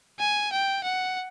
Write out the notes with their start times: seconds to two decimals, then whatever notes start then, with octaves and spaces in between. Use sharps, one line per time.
0.19 G#5
0.52 G5
0.84 F#5